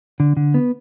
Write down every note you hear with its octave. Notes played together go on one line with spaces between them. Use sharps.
D3
D3
B3